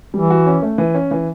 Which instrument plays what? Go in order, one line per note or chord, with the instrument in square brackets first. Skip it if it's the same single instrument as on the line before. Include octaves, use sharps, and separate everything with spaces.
[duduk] E3 [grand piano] G3
[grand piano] F#4
C#4
A3
E3
C#4
E3